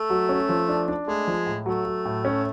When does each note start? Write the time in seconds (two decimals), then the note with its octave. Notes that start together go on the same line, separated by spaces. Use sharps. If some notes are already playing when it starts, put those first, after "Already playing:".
Already playing: A3
0.10 F#3
0.29 C#4
0.49 F3
0.69 D4
0.88 D4
1.07 G#3 A3
1.27 F3
1.46 A2
1.66 F#3 A3
1.85 F#3
2.05 A2
2.25 C#4